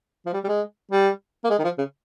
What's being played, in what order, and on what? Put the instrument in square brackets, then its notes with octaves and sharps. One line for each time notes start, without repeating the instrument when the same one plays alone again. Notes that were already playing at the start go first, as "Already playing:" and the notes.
[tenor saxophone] F3
G3
G3
G#3
G3
A#3
G#3
D#3
F3
C#3